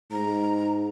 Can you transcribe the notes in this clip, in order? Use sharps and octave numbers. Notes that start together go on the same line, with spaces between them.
G#2 A#5